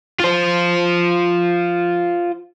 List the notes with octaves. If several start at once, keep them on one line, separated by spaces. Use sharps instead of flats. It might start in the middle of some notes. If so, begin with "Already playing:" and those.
F4 C5